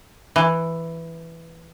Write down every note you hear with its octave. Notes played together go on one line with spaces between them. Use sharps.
E3